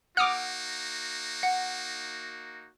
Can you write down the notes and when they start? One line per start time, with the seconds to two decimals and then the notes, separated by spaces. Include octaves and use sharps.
0.17 A#3 D#4 F#4 F#5 D6 D#6 F6
1.43 F#5